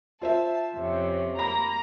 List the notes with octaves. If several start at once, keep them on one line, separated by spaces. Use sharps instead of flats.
F4 C5 E5 A5
F2 C3 C#4
A#3 A#5 B5